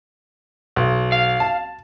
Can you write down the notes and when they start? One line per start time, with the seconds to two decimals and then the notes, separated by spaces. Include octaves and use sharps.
0.76 B1
1.12 F5
1.40 A5